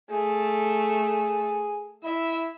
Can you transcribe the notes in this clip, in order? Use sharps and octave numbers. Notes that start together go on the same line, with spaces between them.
A3 G#4
E4 E5